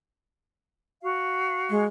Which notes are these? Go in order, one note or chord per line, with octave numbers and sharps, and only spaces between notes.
F#4 F5
G#3